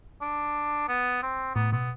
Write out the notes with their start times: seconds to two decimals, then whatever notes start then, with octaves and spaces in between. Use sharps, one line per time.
0.22 D4
0.89 B3
1.23 C4
1.56 A2 B3
1.72 B2 B3